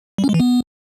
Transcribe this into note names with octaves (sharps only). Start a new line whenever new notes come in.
G3
C#4
G#3
E3
B3